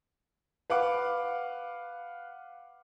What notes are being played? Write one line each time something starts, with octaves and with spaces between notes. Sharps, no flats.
B4 F5 F#5 D6